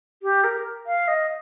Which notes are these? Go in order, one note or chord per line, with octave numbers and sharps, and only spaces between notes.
G4
A#4
F5
D#5